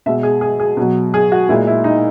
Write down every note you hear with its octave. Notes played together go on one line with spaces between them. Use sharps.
B2 G#3 E5
G#4
G#4
G#4
B2 F#3
G#4
F#4
A#2 G#3 E4
E4
D#4